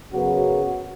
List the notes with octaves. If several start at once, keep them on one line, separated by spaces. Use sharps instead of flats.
F#2 C#3 F#3 B3 F#4